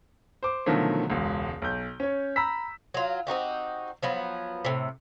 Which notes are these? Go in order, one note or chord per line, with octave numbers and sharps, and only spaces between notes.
C5 D6
B2 D3 D#3 F3 F#3 A3
E1 C#2
B1 G6
C#4 C#5
A#5 B5 E6 B6
F#3 F4
C4 D#4 F#4 G4
F3 F#3 B3
A2 C3